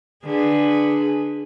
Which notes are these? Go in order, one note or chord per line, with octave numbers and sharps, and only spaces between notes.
D3 G#4 B4